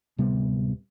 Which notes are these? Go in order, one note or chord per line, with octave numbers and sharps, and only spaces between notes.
D1 C3 G3 B3